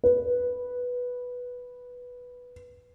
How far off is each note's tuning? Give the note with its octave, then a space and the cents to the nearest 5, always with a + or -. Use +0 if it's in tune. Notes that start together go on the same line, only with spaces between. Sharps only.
B4 -5